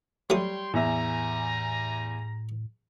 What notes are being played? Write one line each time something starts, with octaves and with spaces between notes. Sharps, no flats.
F#3 G3 A3 C#5 G5 C6 D#6
E2 A2 G3 E5 G#5 A#5